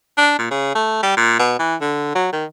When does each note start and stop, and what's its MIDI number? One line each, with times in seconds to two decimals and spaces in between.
0.17 0.34 62
0.38 0.46 46
0.50 0.75 49
0.75 1.00 57
1.03 1.14 55
1.16 1.35 46
1.39 1.56 47
1.59 1.76 52
1.81 2.11 50
2.15 2.30 54
2.32 2.45 51